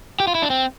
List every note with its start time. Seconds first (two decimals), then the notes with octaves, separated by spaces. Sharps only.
0.20 G4
0.27 F4
0.35 E4
0.42 D4
0.50 C4